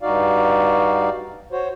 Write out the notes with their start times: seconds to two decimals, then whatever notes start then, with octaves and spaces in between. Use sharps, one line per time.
0.02 G2 D#4 F#4 D5 F5
1.52 F#4 C5 C#5